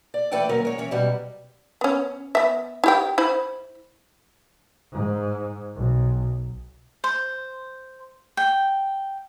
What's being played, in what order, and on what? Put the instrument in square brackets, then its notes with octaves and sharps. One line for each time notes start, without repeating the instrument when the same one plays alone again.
[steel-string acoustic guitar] D5
E3 A3 A4 B4 D5 G5
D#2 F#3 C#4 A#4
G#3 C#5
E3 C#4
B2 F#3 G3
[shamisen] B3 C#4
B3 E5
E4 G4 G5
E4 C5 B5
[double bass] G#2
B1
[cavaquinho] C5
G5